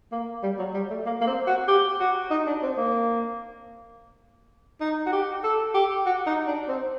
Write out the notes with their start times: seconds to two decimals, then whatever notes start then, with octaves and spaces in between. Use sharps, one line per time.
0.12 A#3
0.43 G3
0.58 F#3
0.74 G3
0.90 A3
1.06 A#3
1.21 A#3
1.27 C4
1.47 F#4
1.67 G4
2.00 F#4
2.30 D#4
2.47 D4
2.62 C4
2.77 A#3
4.81 D#4
5.06 F#4
5.12 G4
5.43 A4
5.74 G4
6.06 F#4
6.26 D#4
6.47 D4
6.68 C4